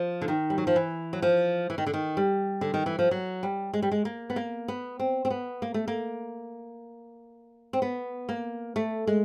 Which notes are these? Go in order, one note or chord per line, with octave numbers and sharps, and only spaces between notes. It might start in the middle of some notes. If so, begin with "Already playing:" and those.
Already playing: F3
D3
D#3
G3
F#3
F3
E3
F#3
F3
E3
D#3
D3
D#3
G3
D3
D#3
E3
F3
F#3
G3
G#3
G3
G#3
A#3
B3
A#3
B3
C4
C4
B3
A#3
A3
A#3
C4
B3
A#3
A3
G#3